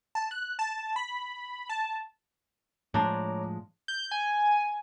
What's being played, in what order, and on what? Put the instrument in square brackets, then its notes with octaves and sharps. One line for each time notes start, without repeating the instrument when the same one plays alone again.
[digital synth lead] A5
F#6
A5
B5
A5
[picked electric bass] A2 F3 G#3 [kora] D4 C5 [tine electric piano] C#5 A#5 D6
[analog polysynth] G6
G#5